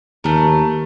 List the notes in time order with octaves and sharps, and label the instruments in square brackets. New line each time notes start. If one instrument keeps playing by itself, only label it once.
[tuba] D#2 [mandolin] A3 A#4